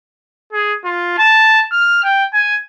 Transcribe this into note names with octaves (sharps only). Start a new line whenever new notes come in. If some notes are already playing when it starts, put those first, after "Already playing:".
G#4
F4
A5
F6
G5
G#5